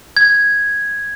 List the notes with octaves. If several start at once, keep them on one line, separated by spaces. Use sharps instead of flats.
G#6